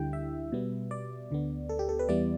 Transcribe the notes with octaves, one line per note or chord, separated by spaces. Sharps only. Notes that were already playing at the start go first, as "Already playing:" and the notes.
Already playing: D2 D3 G3 E4 G5
E5
B2 G3 B3
D5
D2 D3 B3
A4
G4
A4
B4
E2 E3 G3 B3 E4 D5